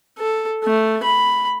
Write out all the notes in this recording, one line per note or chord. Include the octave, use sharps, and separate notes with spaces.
A4
A3
B5